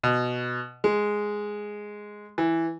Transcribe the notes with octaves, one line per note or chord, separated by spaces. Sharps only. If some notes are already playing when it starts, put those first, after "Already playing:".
B2
G#3
E3